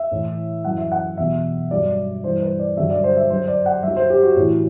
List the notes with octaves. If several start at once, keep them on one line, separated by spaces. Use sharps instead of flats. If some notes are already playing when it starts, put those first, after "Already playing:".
Already playing: E5
A2 E3
F#2 E3 F#5
E5
F#5
E2 B2 F#3 E5
G2 F#3 D5
G2 E3 C5
B4
D5
G2 D3 F#3 E5
D5
C5
E5
F#2 F#3 C5
D5
F#5
F#2 F#3 E5
C5
G4
F#4
A2 E3